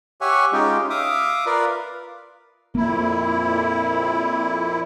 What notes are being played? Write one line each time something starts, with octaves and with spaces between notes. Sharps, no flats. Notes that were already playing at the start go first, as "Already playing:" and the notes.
G4 C#5 E5 F#5 G#5 C#6
G#3 C#4 D#4 F4 G4 G5
E5 F5 D6 D#6
F4 A#4 B4 D5 F5
F2 A#2 A#3 E4